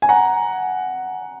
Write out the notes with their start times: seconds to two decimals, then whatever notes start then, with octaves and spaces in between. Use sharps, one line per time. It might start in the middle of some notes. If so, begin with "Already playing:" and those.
0.02 G#5
0.09 F#5 A#5